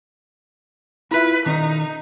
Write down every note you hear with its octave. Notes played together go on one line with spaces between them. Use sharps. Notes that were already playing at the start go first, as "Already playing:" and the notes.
E4 F4 B4 E5
D#3 C#4 D#4